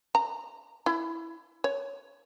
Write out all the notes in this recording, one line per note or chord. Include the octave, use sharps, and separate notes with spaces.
A#5
E4
C#5